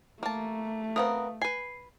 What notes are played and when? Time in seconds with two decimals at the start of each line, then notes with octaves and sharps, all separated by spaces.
0.23 A3 A#3 A5
0.96 B3 C4 A#4 B4 F5 D#6
1.42 B4 G#5 C7